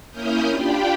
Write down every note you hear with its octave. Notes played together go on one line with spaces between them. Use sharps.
A#3 C#4 E4 D#6 F6 G6
D4 F4 G4 G5 B5